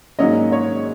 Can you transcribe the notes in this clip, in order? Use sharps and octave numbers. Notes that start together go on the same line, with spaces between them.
G#2 F#3 A#3 C#4 D#5
C#5